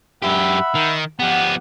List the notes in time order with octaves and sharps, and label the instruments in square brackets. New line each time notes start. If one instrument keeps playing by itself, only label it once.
[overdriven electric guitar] F#2 G4 [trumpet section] E5 F#5 B5
[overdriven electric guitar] D#3
[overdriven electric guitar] F3 B3 [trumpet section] G4 F#5